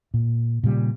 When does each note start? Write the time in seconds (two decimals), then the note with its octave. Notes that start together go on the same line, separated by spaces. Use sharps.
0.14 A#2
0.63 A#2 C#3 F#3 G3